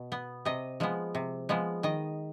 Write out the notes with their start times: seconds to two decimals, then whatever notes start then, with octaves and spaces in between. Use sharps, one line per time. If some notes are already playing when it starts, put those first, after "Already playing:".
Already playing: B2
0.12 B3
0.45 C3 D#5
0.80 F3 G#3 B3
1.15 C3
1.49 F3 G#3 B3
1.83 D#3 D#5